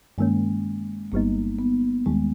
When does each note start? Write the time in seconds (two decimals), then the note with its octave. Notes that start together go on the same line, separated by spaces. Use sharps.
0.18 G2 D#3 G#3 A#3 C#4
1.12 G1 G2 G3 A#3 B3 D#4
1.59 B3
2.06 D#2 D#3 G3 G#3